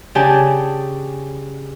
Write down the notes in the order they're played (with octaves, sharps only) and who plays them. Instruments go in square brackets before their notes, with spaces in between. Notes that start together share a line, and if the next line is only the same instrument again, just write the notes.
[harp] C#3 D4 G4 C#5 G#5 A5